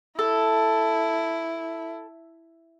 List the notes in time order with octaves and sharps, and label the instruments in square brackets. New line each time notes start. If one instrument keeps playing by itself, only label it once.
[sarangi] E4 [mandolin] A4